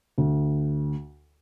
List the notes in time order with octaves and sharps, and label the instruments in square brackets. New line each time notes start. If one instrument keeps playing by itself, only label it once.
[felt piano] D2